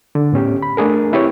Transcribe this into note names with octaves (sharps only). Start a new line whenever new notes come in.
D3
A2 B3 C#4 G4
B5
A3 D4 G#4 A#4
C4 E4 G4 B4 C#5